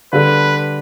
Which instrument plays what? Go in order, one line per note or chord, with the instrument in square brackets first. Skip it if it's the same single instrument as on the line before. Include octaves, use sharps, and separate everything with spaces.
[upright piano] D3 G3 D4 A4 [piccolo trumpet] B4